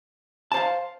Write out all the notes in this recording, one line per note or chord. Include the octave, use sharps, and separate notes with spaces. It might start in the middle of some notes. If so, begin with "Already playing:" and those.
C5 F5 A5